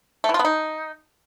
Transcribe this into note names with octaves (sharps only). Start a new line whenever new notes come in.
A3
E3
F4
B3
D#4